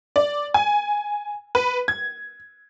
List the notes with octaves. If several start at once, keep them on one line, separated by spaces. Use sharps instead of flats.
D5
G#5
B4
G#6